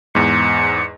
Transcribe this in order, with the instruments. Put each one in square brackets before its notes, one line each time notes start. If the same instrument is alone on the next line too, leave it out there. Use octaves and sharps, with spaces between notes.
[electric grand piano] E2 G#2 [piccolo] C#7